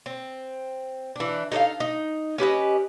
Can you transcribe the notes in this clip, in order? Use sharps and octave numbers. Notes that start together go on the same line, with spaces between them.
C4
E3 D4
D#4 A4 D5 F5
D#4
C#4 G4 B4 D#5